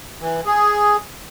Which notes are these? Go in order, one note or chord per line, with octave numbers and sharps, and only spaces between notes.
E3
G#4